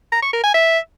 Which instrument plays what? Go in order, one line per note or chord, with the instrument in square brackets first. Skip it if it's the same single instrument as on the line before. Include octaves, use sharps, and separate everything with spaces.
[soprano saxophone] A#5
C#6
A#4
G#5
E5